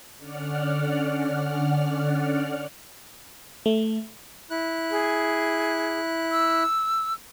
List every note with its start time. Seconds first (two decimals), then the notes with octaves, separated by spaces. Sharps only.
0.17 D3 C#4 D5 F#5 F6
3.66 A3
4.50 E4 F#6
4.90 G#4
6.32 E6